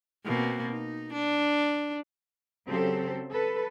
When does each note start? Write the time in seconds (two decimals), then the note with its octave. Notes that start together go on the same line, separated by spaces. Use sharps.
0.24 B2 A#3 C4
0.70 D#4
1.13 D4
2.69 C#3 F#3 C4 G4 A4 C5
3.30 A4 B4